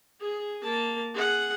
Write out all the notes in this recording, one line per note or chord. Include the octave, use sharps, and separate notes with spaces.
G#4
A#3 A5
G#4 F#5